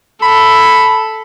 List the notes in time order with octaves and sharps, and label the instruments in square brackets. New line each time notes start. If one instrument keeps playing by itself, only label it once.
[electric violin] A4 [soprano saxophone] B5